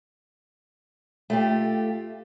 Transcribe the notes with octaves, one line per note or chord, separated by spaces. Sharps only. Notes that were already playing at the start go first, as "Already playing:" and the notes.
A3 F4 G4